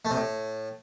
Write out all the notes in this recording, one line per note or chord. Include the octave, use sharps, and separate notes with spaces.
A3
C3
A2